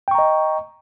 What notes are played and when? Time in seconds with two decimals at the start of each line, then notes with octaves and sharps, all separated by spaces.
0.08 G5
0.11 C#6
0.15 A#5
0.19 D#5